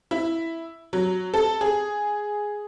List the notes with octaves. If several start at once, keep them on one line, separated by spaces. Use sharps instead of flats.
E4
F#3
A4
G#4